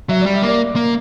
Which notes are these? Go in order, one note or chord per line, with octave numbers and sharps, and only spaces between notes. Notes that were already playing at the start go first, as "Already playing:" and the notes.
F#3 E5
G3 D5
E5
A#3 D5
A#3